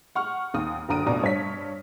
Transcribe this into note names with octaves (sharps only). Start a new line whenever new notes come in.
F#5 C#6 F6
D#2 D#6
F#1 D3 A#5 D#6 D7 D#7
F1 B2 D4 A#5 D#6
G2 C#5 B6